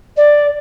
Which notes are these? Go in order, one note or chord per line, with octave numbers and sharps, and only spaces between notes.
D5